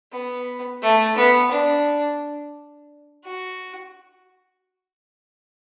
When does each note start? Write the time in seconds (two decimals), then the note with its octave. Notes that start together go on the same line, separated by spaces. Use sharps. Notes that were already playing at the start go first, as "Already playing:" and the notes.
0.12 B3
0.82 A3
1.16 B3
1.51 D4
3.25 F#4